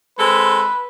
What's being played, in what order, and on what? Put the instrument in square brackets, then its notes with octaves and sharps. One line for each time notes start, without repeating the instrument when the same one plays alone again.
[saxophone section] G#3 C4 A4 [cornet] B4